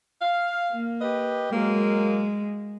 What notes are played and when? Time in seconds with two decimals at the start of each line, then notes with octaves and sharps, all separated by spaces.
0.21 F5
0.70 A#3
1.00 G4 B4 D#5
1.51 F#3 G#3 A#3